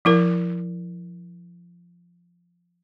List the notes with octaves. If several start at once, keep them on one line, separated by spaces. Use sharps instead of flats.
F3 E4 A#4